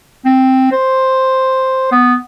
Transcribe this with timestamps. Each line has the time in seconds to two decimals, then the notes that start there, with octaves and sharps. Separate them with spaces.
0.25 C4
0.71 C5
1.91 B3